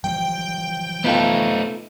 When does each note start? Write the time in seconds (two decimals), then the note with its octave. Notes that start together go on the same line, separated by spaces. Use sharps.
0.04 E3 F3 G3 G5
1.04 A3 B3 D#4 F4 A4